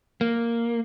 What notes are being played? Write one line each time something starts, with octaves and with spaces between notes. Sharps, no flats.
A#3